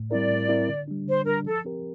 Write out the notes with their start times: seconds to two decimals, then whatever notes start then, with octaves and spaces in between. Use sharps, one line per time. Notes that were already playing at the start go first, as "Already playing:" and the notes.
Already playing: A2
0.10 G3 C4 E4 A#4 D5
0.29 A2
0.49 G3 C4 E4 A#4
0.68 D3
0.88 G3 D4
1.07 D3 C5
1.26 G3 D4 A#4
1.45 F3 A4
1.65 C4 G4 A#4